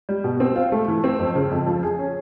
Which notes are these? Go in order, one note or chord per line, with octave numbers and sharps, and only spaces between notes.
G3
B2
C4
F4
A3
E3
C4
F2
C#3
F2
F3
G#4
C#4